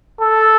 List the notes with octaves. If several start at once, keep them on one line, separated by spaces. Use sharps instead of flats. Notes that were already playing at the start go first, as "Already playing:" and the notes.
A4